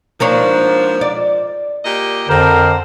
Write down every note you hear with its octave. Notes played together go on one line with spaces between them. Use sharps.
G#2 F3 A#3 D4 C#5
D5
A#2 G4 D#5
F2 D3 C4 A4 A#4 C5